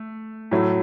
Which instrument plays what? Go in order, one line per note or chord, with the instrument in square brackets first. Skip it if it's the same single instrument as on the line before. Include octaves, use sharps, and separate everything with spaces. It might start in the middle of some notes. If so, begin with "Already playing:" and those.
Already playing: [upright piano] A3
A2 F#3 A3